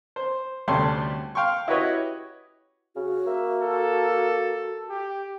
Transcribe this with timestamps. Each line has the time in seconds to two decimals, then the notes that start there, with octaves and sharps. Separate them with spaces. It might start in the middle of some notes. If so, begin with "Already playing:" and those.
0.16 C5
0.68 D2 C3 G3 A3 C#4 C6
1.35 F5 G5 C6 C#6
1.68 E4 F#4 G4 B4 C#5 D#5
2.96 C#3 F#4
3.26 A#3 E5
3.62 A4
4.89 G4